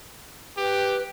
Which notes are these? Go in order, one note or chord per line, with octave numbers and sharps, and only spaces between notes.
G4 B4